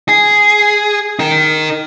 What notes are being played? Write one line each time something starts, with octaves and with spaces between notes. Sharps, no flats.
G#4
D#4 A#4